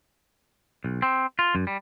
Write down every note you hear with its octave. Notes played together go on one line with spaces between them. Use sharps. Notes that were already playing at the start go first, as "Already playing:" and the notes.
B1
C4
F4
F#2
G3